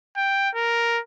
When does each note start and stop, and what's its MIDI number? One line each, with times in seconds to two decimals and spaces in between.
0.17 0.50 79
0.55 1.00 70